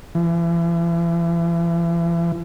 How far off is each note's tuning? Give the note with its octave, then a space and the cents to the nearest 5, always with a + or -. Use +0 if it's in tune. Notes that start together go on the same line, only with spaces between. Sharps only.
E3 +40